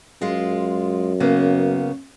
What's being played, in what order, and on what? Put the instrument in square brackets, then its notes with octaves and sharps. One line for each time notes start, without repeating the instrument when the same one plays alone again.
[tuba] F#2 [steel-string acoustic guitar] G#3 F4
[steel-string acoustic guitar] C#3 A#3 B3